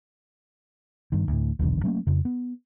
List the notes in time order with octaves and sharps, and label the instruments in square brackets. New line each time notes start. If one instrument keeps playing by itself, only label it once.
[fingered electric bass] G2 D#3
D2 A2
D#1 B1 E2 D3
F#3 A3 A#3 C#4
F2 C#3
B3